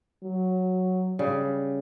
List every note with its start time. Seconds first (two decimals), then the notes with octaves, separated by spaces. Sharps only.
0.23 F#3
1.19 C#3 G3